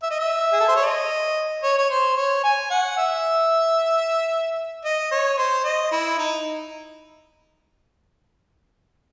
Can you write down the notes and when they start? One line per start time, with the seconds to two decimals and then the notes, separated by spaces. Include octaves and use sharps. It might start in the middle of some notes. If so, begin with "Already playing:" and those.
0.03 E5
0.11 D#5
0.20 E5
0.53 G#4
0.60 A4
0.68 C5
0.76 C#5
0.83 D#5
1.63 C#5
1.78 C#5
1.90 C5
2.17 C#5
2.44 G#5
2.71 F#5
2.97 E5
4.84 D#5
5.11 C#5
5.38 C5
5.64 D#5
5.92 E4
6.18 D#4